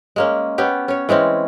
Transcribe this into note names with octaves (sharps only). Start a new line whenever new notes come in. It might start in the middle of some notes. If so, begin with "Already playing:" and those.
G#3 A#3 C#4
B3 C#4 G4
C#4 C#5
E3 G#3 C4 C#4